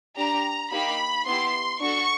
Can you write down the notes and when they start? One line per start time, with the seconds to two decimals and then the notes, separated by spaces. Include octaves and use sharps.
0.17 D4 G4 A#5
0.72 A#3 D#4 G4 B5
1.26 B3 E4 G4 C6
1.81 D4 F#4 A4 C#6